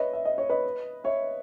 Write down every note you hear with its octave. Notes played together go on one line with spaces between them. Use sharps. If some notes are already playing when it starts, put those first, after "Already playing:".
Already playing: B4 C#5 D#5 E5
E5
D#5
C#5
B4 D#5
C#5 E5